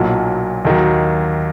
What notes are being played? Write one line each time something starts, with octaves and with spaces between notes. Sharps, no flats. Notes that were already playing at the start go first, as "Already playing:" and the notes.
Already playing: B1 A#2 F#3
D#2 D#3 F#3